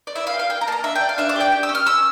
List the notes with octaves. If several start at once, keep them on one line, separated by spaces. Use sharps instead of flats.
D5
E4 E5
F5
G4
F5
A#3 G5
A#5
A#3 A5 A#5
D4 E5
G5
D4
F5
D4 E5
D5
G4 G5
G4
E6
C#4
F6
C#4 E6